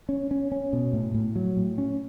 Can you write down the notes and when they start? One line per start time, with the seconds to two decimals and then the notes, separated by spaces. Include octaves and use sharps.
0.09 C#4
0.31 C#4
0.52 C#4
0.73 B2
0.93 A2
1.14 A2
1.36 F#3
1.57 A2
1.78 C#4